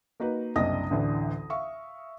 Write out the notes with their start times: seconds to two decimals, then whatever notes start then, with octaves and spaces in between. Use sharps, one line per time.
0.20 A#3 D#4 F#4 B4
0.56 F#1 C2 D4 D#5 D#6 A#6
0.90 A1 D2 D3 E3
1.50 E5 F5 C#6